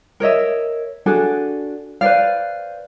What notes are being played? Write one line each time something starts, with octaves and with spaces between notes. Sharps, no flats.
A#4 C#5 D#5 E5
D4 F#4 G#4 A4
B4 C5 D5 F5